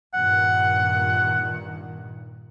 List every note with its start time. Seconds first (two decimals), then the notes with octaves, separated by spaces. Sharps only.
0.14 G2 A#2 D#3 F#5